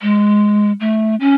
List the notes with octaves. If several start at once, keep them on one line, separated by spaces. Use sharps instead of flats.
G#3
A3
C#4